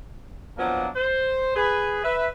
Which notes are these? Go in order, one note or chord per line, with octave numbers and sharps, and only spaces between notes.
F3 F#3 A#3 B3 D4 D#4
C5
G#4 B4
B4 E5